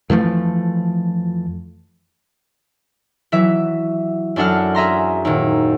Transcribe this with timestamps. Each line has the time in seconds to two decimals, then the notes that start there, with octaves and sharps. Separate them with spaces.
0.10 F2 E3 F3 A3
3.32 E3 F#3 E5
4.36 F#2 D4 A4 F#5 F6
4.75 G#4 E5 A#5 C6
5.25 D#2 A#2